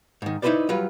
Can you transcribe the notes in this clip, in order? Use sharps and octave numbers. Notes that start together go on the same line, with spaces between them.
G#2 D#3
D#4 E4 G4 B4 C5 D5
F#3 G3 F4 B4